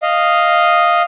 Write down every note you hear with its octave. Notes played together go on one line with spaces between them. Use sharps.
D#5 F5